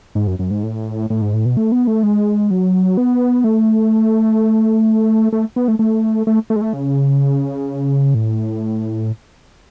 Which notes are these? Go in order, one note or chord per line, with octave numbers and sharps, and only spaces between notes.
G#2
F#2
F#2
G#2
A2
A2
G#2
A2
B2
A3
B3
A3
G#3
F#3
B3
A3
A3
B3
A3
A3
A3
A3
G#3
A3
C#3
A2